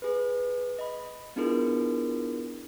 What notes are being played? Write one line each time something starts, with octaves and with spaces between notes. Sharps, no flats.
G#4 B4
D#5 B5
B3 D4 E4 F4 G#4 A#4